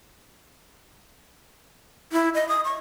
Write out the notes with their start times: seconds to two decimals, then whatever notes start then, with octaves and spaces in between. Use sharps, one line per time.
2.13 E4
2.35 D#5
2.49 D#6
2.65 C#6